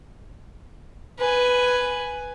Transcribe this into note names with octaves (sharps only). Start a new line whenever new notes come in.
B4 G#5